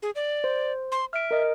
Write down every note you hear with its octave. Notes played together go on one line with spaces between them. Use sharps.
G#4
D5
C5
C6
E5 F6 D7
A#4 D#5